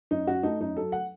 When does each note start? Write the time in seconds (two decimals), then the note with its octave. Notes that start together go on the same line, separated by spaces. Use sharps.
0.11 F#2 D#4
0.27 F#2 F#4
0.43 A3 D#4
0.60 F#2 D#4
0.77 F#3 A4
0.92 F#5